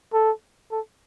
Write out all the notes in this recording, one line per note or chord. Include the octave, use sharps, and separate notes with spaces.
A4
A4